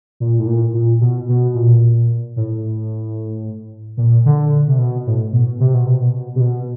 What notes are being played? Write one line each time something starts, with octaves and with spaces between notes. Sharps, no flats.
A#2
A2
A#2
A#2
B2
B2
A#2
A2
A#2
D3
C3
B2
A2
B2
C3
B2
C3
B2
C3
B2